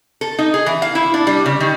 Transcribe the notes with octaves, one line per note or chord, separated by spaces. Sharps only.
A4
D#4
G#4
E3
F5
E4
D4
G3
C#3
D#3